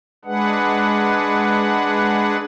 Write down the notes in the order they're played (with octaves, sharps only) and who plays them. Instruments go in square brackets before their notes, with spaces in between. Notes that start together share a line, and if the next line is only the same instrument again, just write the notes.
[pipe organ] G#3 D4 G#4 B4 F#5